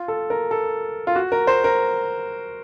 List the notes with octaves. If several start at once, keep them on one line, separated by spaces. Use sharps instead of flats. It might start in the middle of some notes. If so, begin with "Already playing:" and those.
Already playing: F4
A4
A#4
A4
F4
F#4
A#4
C5
A#4